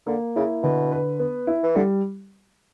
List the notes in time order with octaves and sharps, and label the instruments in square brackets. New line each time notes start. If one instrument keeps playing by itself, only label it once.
[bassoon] D3 [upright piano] A#3
[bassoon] C#3 [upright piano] E4
[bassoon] B2 [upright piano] D3
[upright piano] B4
B3
E4
[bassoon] E3
[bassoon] D3 [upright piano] G3